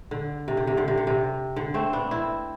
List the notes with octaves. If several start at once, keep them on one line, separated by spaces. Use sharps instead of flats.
D3
C3
D3
C3
D3
C3
D3
C3
D3
A3 C4
B3 D4
C4 E4